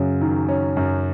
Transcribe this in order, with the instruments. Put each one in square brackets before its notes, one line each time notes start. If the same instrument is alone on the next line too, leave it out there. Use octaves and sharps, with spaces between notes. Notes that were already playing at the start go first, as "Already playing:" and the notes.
Already playing: [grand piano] F#2 F#3 [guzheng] C#3
[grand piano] D#3
C#4
F#2